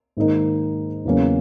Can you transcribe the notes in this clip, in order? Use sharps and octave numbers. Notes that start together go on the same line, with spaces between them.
G#2 D#3 A#3 D#4 A#4
E2 C#3 F#3 A#3 C#4